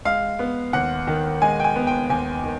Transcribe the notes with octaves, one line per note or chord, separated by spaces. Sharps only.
G#3 F5
B3
D#2 F#5
D#3
G#3 G#5
G5
G#5
B3
G5
D#2 G#5
D#3